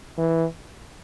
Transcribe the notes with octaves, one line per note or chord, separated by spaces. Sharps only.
E3